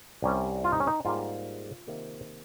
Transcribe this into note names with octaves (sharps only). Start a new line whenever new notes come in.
C2 C3 G3 C#4
F4
D#4
C#4
D#4
G#2 G3 A#3 F4
C3 D#3 A#3